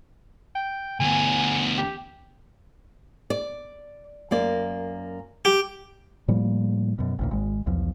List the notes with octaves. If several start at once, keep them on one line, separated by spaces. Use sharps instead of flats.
G5
D2 B3 G#5
G4
D5
F#2 A#3 D5
G4
A2 F3 G3 A#3
F#2 B2
A1 D2 A#2
G#1 G#3
B1 E2 F3